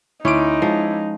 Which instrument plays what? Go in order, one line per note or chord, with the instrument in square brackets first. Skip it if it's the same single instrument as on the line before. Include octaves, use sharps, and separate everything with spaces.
[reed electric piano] D2 C6 [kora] C#4 [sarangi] D#4 [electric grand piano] E4 D6 D7
[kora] F3 [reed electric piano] G#3